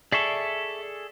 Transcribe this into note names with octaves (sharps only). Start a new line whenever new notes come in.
G#4 A4 D5 E5 C#6